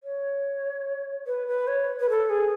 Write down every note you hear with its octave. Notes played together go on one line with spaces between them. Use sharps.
C#5
B4
B4
C#5
B4
A4
G#4